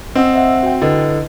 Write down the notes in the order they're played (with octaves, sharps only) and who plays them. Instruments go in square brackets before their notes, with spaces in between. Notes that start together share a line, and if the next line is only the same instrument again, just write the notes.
[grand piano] C4 [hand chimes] D#5 F#5 E6
[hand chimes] C5 E5 F#5
F#4 G5
[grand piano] D3 [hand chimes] E4 B4 D#5